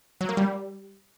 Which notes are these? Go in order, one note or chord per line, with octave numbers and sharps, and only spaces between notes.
F#3
A#3
G3